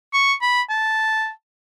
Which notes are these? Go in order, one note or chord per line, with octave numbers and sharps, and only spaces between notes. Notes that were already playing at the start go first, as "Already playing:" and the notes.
C#6
B5
A5